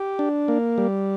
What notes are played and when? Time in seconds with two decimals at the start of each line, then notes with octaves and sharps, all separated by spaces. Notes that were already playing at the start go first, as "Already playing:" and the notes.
Already playing: G4
0.19 D4
0.48 A#3
0.78 G3